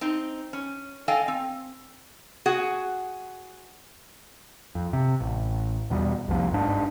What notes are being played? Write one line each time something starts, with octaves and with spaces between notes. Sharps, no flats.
C4 D#4
C#4
A4 D#5 F5 G5 G#5
C4
F#4 G#4 F#5
F2
C3
A1
E2 B2 G3
C2 F2 F3 A#3
G1 G#2 D4